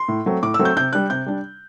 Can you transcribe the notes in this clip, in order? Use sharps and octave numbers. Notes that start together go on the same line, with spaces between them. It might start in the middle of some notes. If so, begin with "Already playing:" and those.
Already playing: C6
A2
F#3 A3 C4
A2 D6
E6
F#3 A3 C4
G6
C3 G6
G3 D4 F#6
C3 G6
G3 D4